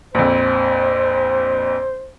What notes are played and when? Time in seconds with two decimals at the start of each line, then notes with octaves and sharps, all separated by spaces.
0.15 A#1 F2 C5